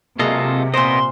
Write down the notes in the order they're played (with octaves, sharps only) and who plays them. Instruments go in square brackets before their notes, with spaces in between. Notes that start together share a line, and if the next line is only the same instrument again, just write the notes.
[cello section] C3 [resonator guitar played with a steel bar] F#3 G#3 A#3 [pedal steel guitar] F4 A4 D#5
[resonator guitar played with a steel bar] A#2 C5 [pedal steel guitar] B3 A#4 D#5 [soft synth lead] C6